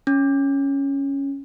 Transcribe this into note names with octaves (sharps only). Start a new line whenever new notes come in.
C#4